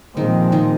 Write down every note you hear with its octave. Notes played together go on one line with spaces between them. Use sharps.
A#2 D#3 F3 G#3 C4 D#4
D#3 D#4